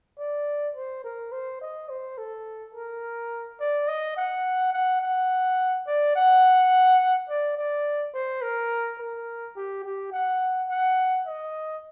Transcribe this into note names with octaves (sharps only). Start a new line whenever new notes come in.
D5
C5
A#4
C5
D#5
C5
A4
A#4
D5
D#5
F#5
F#5
F#5
D5
F#5
D5
D5
C5
A#4
A#4
G4
G4
F#5
F#5
D#5